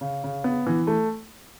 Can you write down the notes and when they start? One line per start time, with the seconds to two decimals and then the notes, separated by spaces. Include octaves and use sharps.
0.01 C#3
0.24 C#3
0.44 B3
0.67 E3
0.87 A3